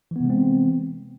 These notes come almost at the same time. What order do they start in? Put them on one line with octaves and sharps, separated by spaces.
E3 B3 C3 G#3 C4